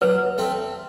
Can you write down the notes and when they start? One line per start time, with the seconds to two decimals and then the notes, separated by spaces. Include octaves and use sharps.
0.01 F#3 B4
0.38 A3 C4